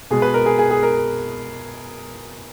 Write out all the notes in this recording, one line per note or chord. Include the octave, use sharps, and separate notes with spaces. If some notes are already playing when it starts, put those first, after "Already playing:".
B2 G#3 G#4
B4
A#4
G#4
G#4
G#4
A#4